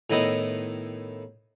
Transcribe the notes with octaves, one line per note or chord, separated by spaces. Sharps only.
A2 D#3 B3 E4 D#5